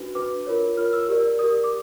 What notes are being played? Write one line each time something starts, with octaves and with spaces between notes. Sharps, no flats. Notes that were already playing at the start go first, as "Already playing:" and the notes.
Already playing: D4 F#4 B4
D4 F#4 B4 D6
F4 A#4 C#5
F4 A#4 C#5 F6
E6
G4 A#4 D5
G4 A#4 D5 D#6
D6